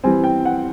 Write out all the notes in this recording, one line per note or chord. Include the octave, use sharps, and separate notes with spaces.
E3 G3 C4 G#5
G5
F#5